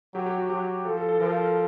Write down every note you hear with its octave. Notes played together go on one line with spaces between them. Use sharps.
F#3 G4
G4
F#4
F#3 G4
F3 A4
A4
A4
F3 A#4